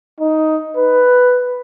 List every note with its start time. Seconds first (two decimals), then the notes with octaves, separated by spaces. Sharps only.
0.20 D#4
0.77 B4